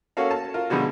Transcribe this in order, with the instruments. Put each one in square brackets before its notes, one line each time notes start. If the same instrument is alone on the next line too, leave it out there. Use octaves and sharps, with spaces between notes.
[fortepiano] A#3 C#4 F#4 A4 F5
A5
F4 A#4
B2 D3 G3 G#3 F#4